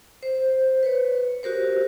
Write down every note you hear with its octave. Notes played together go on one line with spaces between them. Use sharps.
C5
B4 C#5
F#4 G4 A#4 C5